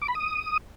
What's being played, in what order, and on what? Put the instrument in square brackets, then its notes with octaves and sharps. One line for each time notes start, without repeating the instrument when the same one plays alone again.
[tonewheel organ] D6
B5
D#6